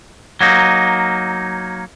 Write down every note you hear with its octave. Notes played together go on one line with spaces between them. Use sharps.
F#3 A#3 D#4